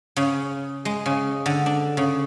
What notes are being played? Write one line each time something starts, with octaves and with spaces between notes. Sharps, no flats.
C#3
G#3
C#3
D3
D4
C#3